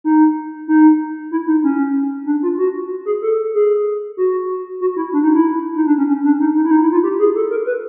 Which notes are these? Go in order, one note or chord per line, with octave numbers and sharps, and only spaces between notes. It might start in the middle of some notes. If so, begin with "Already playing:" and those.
D#4
D#4
E4
D#4
C#4
D4
F4
F#4
G#4
A4
G#4
F#4
F#4
E4
D4
D#4
E4
D#4
D4
C#4
C#4
D4
D#4
D#4
E4
D#4
E4
F4
G4
G#4
A4
A#4
B4